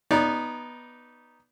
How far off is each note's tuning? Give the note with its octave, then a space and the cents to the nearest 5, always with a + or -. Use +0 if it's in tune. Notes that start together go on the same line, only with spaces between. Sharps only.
B3 -10 D#4 +0 D5 -15